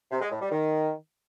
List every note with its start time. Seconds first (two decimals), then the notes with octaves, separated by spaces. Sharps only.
0.11 C3
0.21 G#3
0.31 A2
0.41 G3
0.52 D#3